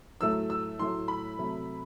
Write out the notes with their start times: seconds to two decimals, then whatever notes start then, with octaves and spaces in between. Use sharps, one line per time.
0.21 A2 F#3 A3 E6
0.50 E6
0.79 A2 F#3 A3 C6
1.08 B5
1.38 C3 F#3 A3